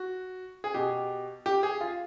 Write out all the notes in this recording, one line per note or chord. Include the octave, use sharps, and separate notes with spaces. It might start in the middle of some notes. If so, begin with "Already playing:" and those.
Already playing: F#4
G#4
B2 G4
G4
G#4
F4